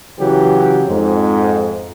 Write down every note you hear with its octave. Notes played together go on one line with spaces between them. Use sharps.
C#3 E3 F#3 G4
F2 G#2